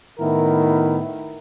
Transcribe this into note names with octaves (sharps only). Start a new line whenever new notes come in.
A2 D#3 B3 E4 A#4